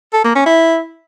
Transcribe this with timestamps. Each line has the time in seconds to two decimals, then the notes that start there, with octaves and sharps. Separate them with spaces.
0.13 A4
0.24 A#3
0.35 C#4
0.46 E4